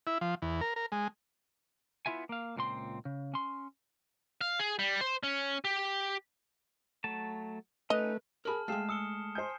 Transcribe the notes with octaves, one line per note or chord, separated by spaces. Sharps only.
E4
F3
E2
A#4
A#4
G#3
B3 E4 F4 E5 G#5
A#3 F5
C#2 A#2 C4 C6
C#3
C#4 C6
F5
G#4
G3
C5
C#4
G4
F#3 A3 A5
A3 C#4 D#4 B4 D#5
G#4 A#4 A5 B5 F6 F#7
G#3 A3 G#4 F5 G5 F6 C7 E7
D#6 E6 C#7 G7
C5 G#5 G6 C7